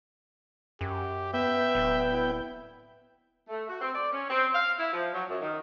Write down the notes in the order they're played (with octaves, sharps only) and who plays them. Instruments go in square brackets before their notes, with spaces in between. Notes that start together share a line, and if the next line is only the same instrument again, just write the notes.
[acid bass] F#2 [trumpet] G4
[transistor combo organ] B3 G5 [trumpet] E5
[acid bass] D1
[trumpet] E4
[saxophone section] A3
F#4
C4
D5
C#4
C4
F5
E4
F3
F#3
F#2
D#3